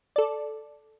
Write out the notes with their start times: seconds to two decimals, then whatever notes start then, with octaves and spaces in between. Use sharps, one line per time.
0.16 A4 D5